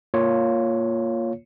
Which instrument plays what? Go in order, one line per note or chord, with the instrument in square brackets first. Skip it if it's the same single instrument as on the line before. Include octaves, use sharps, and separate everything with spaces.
[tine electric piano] A#3 F4 C#5